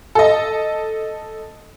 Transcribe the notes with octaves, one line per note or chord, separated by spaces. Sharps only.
A4 D#5